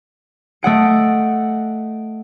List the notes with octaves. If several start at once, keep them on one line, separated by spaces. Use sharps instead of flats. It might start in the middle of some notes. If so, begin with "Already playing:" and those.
A3 D#5 F#5 D7